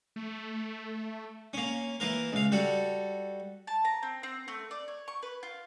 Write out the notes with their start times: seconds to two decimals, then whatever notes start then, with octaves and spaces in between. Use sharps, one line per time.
0.16 A3
1.53 A#3 C#4
2.00 E3 A#3 A#4
2.32 C#2 F5
2.52 G3 F#4 A4
3.67 A5
3.85 A#5
4.03 C4
4.23 C4
4.48 A3
4.71 D5
4.88 C#5
5.08 C#6
5.23 B4
5.43 F4